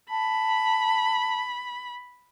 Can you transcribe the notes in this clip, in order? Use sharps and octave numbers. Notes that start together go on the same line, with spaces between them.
A5 B5